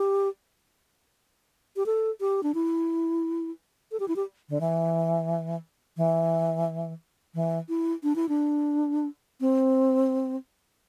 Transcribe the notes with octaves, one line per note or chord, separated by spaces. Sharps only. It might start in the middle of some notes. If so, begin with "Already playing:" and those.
Already playing: G4
G4
A4
G4
D4
E4
A4
G4
E4
G4
D3
E3
E3
E3
E4
D4
E4
D4
C4